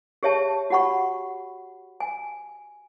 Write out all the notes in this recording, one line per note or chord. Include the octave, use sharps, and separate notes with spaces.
G4 G#4 C#5 E5 A5
F#4 G4 F#5 B5 C#6
G#5